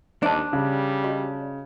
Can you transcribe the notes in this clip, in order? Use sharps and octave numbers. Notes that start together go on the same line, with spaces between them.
D#2 D4 C5 D#5 A5
C#3 G3
F#4 C#5 D#5